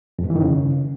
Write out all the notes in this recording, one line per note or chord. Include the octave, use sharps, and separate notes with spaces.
F2
G2
E3
D#3
C#3